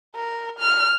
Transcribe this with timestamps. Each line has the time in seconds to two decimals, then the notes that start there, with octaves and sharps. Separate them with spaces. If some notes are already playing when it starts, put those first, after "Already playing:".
0.16 A#4
0.59 F6